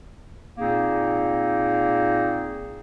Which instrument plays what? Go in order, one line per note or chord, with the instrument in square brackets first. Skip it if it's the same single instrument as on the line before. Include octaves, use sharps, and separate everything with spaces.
[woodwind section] A#2 A#3 C4 D#4 G#4